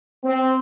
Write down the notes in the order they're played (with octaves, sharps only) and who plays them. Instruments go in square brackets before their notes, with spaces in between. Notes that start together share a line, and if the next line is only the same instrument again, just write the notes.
[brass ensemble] C4